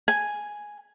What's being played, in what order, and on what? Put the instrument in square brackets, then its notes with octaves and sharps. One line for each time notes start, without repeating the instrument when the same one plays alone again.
[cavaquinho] G#5